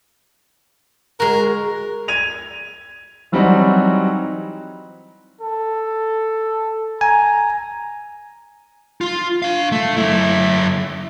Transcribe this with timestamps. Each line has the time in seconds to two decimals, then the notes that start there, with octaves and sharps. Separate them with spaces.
1.20 G#3 F#4 A#4
2.08 G#6 D#7 F7
3.32 E3 F#3 G3 C4 D#4 F#4
5.41 A4
7.01 G#5 A#5
9.01 F4
9.42 D4 F5
9.72 A3
9.97 F#2 E4